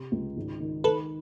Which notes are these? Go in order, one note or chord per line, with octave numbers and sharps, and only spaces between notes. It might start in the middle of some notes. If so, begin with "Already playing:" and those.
Already playing: C3
C#2
G#1
D#3
D#3 A4 B4